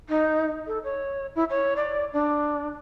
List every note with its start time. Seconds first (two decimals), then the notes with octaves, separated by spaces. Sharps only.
0.09 D#4
0.67 A4
0.84 C#5
1.35 E4
1.50 C#5
1.76 D5
2.13 D4